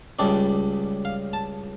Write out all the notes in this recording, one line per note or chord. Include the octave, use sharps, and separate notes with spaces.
C#2 C#3 G3 D4 D5
F5
A5